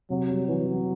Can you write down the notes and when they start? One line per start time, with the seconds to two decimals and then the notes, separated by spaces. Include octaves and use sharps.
0.10 C3 F#3
0.30 G3
0.48 E3 F#3
0.68 E3